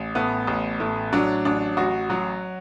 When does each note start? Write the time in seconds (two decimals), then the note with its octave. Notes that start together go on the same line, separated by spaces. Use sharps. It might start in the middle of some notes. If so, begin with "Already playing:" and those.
Already playing: A1
0.15 A2 B3
0.47 A1
0.80 A2
1.13 F#3 D4
1.45 A1 D4
1.77 A1 F#4
2.10 F#3